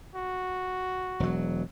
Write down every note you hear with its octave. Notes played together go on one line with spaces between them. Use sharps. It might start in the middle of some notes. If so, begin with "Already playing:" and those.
F#4
E1 F#3